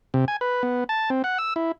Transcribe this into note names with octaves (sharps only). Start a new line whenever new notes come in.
C3
G#5
B4
B3
A5
C4
F#5
E6
E4